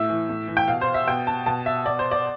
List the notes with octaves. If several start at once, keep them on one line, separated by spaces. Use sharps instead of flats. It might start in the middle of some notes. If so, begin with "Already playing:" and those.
Already playing: A2 E5
E3
A2
E3
G5
B2 F5
C5
E5
B2 G5
A5
B2 A5
E5
B2 D5
C5
D5